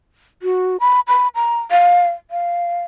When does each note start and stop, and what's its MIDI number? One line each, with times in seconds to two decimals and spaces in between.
0.43 0.77 66
0.80 1.00 83
1.08 1.28 83
1.35 1.59 82
1.71 2.09 77
2.31 2.83 77